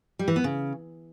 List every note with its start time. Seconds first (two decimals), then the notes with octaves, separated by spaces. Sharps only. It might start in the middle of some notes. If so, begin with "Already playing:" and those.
0.19 G3
0.28 E3
0.36 B3
0.44 C#3